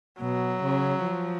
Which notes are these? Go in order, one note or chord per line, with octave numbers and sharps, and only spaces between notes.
B2 F#3
C#3
F3